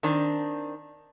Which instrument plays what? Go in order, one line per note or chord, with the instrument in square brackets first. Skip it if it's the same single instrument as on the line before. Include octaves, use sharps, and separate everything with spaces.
[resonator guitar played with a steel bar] D#3 C4 D4